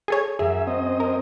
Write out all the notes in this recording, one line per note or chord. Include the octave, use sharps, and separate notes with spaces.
G#4 A4 C#5
F#2 F#3 G#4 E5
C4 D#5
A#4